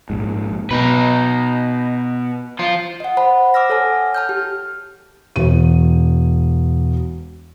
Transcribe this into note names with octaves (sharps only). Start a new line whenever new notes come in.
A#1 G#2
B2 D#4 B4
F3 F4
D#5 F#5
C5 F#5 A5 B5
D6 E6 F6 A#6
A4 C#5 F#5 G#5 A5
A5 F6 G6
G4
E1 D#7